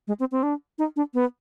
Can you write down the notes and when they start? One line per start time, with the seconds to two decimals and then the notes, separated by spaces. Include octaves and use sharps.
0.08 G#3
0.20 C4
0.32 C4
0.43 D4
0.79 D#4
0.96 D4
1.14 B3